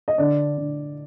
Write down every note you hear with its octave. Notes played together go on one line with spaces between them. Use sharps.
D#5
D3 D5
D3